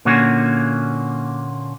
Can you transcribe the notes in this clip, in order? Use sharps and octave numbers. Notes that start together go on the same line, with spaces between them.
A#2 D3 A#3 C#4 F#4